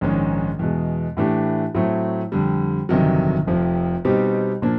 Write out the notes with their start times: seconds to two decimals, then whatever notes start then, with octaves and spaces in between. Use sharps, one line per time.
0.01 A#1 G#2 D#3 G#3 C#4
0.59 E2 B2 G#3
1.17 A2 E3 A3 D4 G4
1.75 A2 F#3 A3 C4
2.32 F2 D3 G3
2.89 G1 F2 C3 D#3 F#3
3.47 F1 F2 C3 F3
4.05 B2 G3 C4 D#4 G4
4.62 A#2 F3 A#3 D4